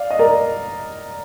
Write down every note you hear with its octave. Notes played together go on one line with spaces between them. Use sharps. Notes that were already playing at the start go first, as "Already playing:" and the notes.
Already playing: D5 F5
D#5
A#4 D5